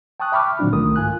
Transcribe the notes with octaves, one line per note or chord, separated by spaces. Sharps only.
G5 A5 C#6 D#6 F#6
E5 G5 B5 C#6 D6 F6
A#2 D#3 F#3 C4 D4 F4
C2 D#3 A3 A#4 D#6
G#2 F4 G#5 F#6